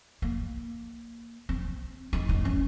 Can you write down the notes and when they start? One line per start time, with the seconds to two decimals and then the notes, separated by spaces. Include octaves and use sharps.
0.22 A#3
1.49 C4
2.13 D#4
2.29 D#4
2.45 C#4